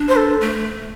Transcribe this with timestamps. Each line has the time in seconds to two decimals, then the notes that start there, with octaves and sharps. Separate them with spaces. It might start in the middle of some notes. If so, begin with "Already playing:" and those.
Already playing: D4
0.08 C5
0.16 A4
0.41 A3